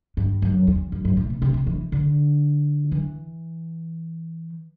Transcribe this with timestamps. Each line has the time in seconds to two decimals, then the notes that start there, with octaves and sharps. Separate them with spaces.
0.17 G2
0.42 F#2
0.67 E2
0.92 F#2
1.05 G2
1.17 A2
1.30 B2
1.42 C3
1.54 C3
1.67 E3
1.92 D3
2.92 E3